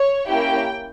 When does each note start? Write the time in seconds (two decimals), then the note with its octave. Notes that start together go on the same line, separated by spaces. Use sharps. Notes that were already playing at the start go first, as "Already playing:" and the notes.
Already playing: C#5
0.27 A#3 C#4 E4 G4 G5